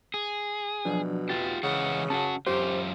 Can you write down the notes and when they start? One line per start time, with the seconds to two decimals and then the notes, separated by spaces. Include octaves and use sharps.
0.14 G#4
0.85 B2 F3 F#3 D4
1.29 F4 G4 A6
1.63 C#3 E3 G#3 F#5
2.10 C#4 F#4 F#5 A5
2.47 F#2 F4 G4 C5